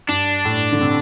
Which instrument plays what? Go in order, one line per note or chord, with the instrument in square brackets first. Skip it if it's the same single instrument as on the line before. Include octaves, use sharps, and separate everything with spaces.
[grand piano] G2 [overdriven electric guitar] D4
[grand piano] A2
D3
C3